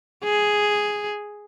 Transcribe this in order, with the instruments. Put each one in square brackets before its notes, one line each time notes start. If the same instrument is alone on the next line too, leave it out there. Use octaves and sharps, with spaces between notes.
[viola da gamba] G#4